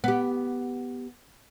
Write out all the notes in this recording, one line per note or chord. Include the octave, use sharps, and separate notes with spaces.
B3 G4